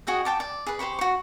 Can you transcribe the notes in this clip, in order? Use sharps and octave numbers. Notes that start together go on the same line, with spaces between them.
F#4 G#4 D#5 G5
G5 A5 D6
D5
G#4 B4
G4 C5 B5 C#6
F#4 C#6